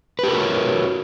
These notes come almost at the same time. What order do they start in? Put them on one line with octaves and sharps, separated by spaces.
B4 G4 A#4 F#4 C#5